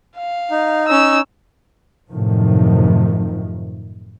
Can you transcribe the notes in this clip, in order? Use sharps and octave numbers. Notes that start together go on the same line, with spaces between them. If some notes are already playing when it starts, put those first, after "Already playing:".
F5
D#4
C#4 E6
F#2 A2 C3 D#3 F3